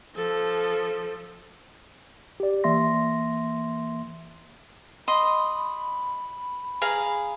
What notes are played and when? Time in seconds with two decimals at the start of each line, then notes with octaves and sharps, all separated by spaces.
0.15 F3 A4
2.40 G4 D5
2.64 E3 A#3 E5 C6 A#6
5.08 D#5 B5 C6
6.82 G#4 F5 A#5